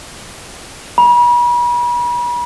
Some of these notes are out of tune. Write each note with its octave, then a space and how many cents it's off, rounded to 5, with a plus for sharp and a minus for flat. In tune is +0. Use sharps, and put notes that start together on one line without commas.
B5 -40